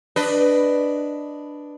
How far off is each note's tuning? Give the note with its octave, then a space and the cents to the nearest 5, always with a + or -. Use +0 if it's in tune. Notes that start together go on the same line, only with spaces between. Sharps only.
D4 +0 B4 +0 D#5 +0